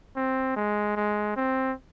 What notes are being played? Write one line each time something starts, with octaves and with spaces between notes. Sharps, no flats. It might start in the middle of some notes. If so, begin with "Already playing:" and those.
C4
G#3
G#3
C4